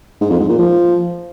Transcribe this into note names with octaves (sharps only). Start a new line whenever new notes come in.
G#2
F2
G#2
A#2
F3